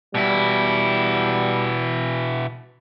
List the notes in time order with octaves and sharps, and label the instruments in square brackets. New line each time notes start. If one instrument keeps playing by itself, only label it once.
[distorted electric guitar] B2 E4 [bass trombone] G3